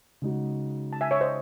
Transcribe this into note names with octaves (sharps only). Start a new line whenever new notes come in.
C#3 G#3 D#4 F#4
A5
E5 G#5
C#5 E5
C5 D#5